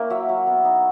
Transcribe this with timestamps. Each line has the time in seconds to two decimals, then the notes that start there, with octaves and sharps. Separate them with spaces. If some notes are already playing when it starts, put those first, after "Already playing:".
Already playing: A#3 C#4 E4
0.10 F#3 E5
0.29 F#3
0.47 B3
0.65 D#4